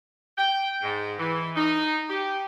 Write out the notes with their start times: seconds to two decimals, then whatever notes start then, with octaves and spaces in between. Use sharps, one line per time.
0.37 G5
0.82 G#2
1.18 E3
1.56 D#4
2.09 G4